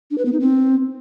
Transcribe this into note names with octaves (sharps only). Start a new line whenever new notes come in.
D4
B4
B3
D#4
C4